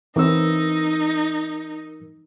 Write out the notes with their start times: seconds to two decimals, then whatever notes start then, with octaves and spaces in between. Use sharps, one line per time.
0.16 E3 C4 D#4 E4 A#4 E6